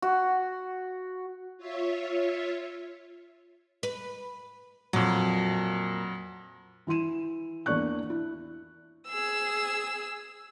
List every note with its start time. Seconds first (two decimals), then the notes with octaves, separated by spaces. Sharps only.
0.02 F#4
1.57 F4 C#5 E5
3.83 B4
4.93 F2 A#2 F#3
6.87 E3 E4 C6 D#7 E7
7.66 E2 A#3 D4 D5 C#6 F#6
8.10 E4
9.09 G#4 E6